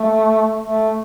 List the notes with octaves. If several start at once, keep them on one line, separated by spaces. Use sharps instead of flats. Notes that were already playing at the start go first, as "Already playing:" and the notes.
Already playing: A3
A3